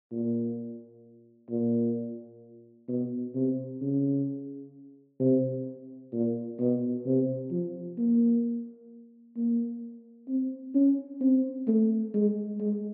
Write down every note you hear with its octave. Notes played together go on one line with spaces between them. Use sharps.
A#2
A#2
B2
C3
C#3
C3
A#2
B2
C3
F3
A#3
A#3
C4
C#4
C4
A3
G#3
G#3